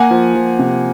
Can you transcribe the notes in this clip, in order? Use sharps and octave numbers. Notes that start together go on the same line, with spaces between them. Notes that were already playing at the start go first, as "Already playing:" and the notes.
Already playing: A#3 F#5 G#5
F3
F3
C3